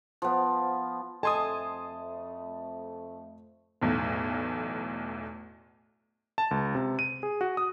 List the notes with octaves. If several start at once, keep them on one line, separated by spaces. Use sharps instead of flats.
F3 B3
F2 A3 A4 D#5 G#5 A5 C6 D#6
B1 E2 A2
A5
C#2
C3
D#7
G#4
F#4
D#6